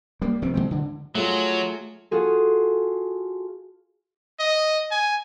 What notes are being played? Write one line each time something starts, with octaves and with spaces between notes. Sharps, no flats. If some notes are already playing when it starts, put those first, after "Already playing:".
G3 A#3
F1 D#3 G3 C4
D3 F#3 G#3 C4
D3
F#3 A3 F4 G#4
F4 F#4 G#4 A4
D#5
G#5